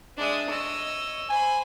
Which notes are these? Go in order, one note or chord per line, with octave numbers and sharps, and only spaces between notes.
G#3 D4 E5 D#6
C#5 D#5 E6
C5 G#5 B5